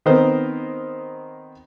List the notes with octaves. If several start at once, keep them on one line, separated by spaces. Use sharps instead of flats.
D#3 B3 C4 D#4 A#4 C5